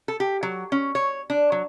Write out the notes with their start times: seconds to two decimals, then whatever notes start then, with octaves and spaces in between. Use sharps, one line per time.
0.08 A4
0.20 G4
0.43 F#3
0.72 C#4
0.95 C#5
1.30 D4
1.52 F#3